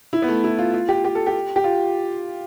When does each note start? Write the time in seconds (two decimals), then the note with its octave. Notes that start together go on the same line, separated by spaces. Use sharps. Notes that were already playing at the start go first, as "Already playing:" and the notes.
0.13 E4
0.22 B3
0.29 A3
0.44 E4
0.59 F4
0.73 F4
0.89 G4
1.05 G4
1.15 A4
1.27 G4
1.56 G4
1.64 F4